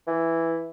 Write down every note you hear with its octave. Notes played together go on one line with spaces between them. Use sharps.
E3